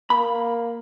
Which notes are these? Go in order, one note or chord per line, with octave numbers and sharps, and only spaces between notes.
A#3 B5